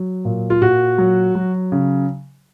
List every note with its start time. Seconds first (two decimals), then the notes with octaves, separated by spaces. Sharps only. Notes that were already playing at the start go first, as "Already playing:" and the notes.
Already playing: F#3
0.25 A#2
0.50 F4
0.61 A#2 F#4
0.98 F#3
1.35 F#3
1.72 C#3